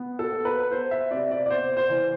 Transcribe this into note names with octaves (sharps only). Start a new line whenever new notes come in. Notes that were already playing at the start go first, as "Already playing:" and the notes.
Already playing: B3
A4
B3
B4
B3 C5
E5
C3 D5
D5
D5
B3 C5
C5
E3